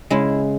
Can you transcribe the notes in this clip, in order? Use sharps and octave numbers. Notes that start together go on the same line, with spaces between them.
C#3 G#3 E4